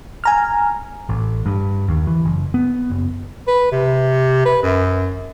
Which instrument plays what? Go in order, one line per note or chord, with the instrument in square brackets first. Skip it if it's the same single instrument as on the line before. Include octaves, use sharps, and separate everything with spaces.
[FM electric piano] G#5 A#5 F6
[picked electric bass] A1
G2
D#2
E3
F#1
B3
F#1
[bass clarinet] B4
C3
B4
F#2